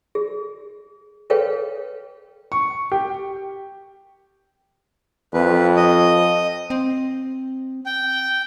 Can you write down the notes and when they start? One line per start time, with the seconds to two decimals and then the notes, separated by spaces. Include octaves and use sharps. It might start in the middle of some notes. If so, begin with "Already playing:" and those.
0.15 G#4
1.30 G#4 A4 B4 C#5 F5 G5
2.52 C#6
2.92 G4
5.34 F2 B4
5.77 D#5 D#6
6.70 C4
7.86 G5